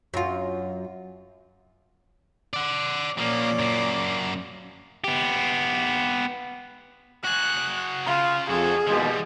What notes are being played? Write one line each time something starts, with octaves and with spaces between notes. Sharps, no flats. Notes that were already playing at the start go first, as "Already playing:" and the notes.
F#2 F4
D5 F#5
A#2 F3 A#3 C#4 D5
F#2 A#3
B3 G4
F#4 G#4 F#6
C#3 F4
F2 F#4 G#4 A4
D#2 B2 E3 G3 G#3